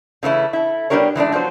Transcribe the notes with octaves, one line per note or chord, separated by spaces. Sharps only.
C#3 E3 A3 E4
E4 A4
G3 B3 D4 G4 A#4 C#5
E3 G#3 A3 D4
F3 F#3 B3 C5